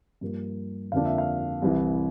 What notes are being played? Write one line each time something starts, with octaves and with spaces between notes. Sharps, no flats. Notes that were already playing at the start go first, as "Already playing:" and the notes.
G2 F3 A#3
F2 D3 F3 A#3 D4 F5
E5
F5
C2 C3 E3